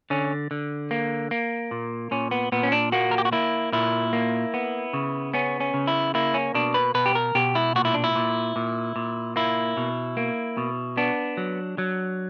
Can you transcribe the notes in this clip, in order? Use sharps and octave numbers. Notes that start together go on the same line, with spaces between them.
D3 C#4
D3
A#3
A#3
A#2
A#2 C#4
B3
A#2 B3
C#4
D4
A#3 F#4
A#4
G4
F#4
A#3 E4
A#2 E4
A#3
B3
C#3
B3 C#4
C#4
C#3
E4
A#3 E4
C#4
B2 D4
B4
B2 B4
G4
A#4
B2 G4
E4
A#2 F#4
E4
D4
E4
A#2
A#2
A#2
A#3 E4
B2
A#3
B2
B3 D4
F#3
F#3